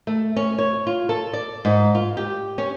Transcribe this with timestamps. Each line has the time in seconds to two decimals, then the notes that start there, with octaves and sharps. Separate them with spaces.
0.07 A3
0.36 C#4
0.58 C#5
0.87 F4
1.09 A4
1.33 D5
1.65 G#2
1.95 F4
2.17 G4
2.58 C#4